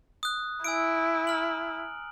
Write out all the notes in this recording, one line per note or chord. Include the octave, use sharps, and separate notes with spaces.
D#6 F#6
E4 G#5 E6 D7
A#5 F6 F#7